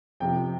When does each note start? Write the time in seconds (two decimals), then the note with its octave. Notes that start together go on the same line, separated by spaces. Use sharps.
0.20 F2 C3 F3 G5